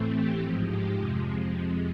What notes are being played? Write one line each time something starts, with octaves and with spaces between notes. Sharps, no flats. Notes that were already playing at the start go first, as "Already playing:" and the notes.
Already playing: A2 E3 A3 C4
G4
G#2 F3 G#3 G4
G4
F2 C3 F3 G#3 G4